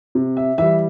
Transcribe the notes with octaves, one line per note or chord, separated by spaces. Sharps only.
C3
E5
E3 G3 E5